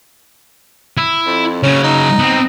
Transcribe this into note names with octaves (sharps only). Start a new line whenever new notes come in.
E4
F2
C#3 F#3 C#4
D#4
B3 C4